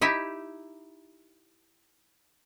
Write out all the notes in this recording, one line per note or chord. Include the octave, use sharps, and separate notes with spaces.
D#4 E4 G4 E5